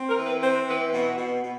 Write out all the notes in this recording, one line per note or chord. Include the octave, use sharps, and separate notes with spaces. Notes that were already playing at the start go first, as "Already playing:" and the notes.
Already playing: C4
A#4
E3
B4
C4 C5
B4
E3 B4
B2 F#4
B2
B2